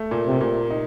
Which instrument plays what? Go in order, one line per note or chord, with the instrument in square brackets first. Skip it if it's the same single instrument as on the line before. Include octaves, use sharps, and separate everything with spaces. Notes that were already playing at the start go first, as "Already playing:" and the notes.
Already playing: [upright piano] A3
A#2
[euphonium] C3
[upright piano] A#2
D#4